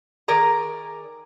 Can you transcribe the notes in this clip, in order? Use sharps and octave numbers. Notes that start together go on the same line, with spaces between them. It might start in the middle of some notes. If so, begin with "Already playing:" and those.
D#3 G#4 A#4 D5 A#5